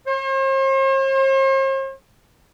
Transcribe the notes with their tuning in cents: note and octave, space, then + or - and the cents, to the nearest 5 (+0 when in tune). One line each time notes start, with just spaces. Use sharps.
C5 +45